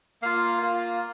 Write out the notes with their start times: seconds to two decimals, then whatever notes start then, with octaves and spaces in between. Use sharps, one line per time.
0.22 A#3 F4 F5
0.62 A#3 F4